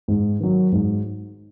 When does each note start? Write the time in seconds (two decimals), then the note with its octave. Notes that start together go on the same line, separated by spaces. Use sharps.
0.08 G#2
0.40 D#3 F#3
0.72 G#2